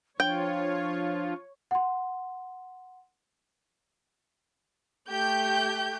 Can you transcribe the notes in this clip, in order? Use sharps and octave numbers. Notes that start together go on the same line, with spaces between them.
F3 D4 F4 C#5 G5
F#5 C6
A3 G4 G6